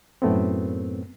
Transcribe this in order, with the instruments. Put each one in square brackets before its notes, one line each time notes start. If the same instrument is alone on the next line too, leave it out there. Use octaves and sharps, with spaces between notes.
[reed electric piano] F#2 A2 A3 B3 C4